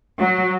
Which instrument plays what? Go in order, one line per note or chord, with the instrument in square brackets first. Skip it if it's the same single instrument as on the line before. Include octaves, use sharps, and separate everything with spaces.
[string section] F#3